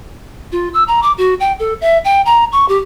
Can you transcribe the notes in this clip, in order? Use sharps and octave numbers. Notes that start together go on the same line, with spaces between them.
F4
E6
A#5
D6
F#4
G5
A4
E5
G5
A#5
C#6
G4